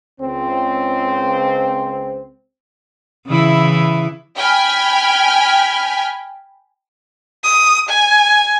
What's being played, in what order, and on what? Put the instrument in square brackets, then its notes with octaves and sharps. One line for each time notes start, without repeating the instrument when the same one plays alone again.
[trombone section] C#2 C4
[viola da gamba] C#3 E3 E4
[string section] G5 G#5 B5 F6
[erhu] D#6
G#5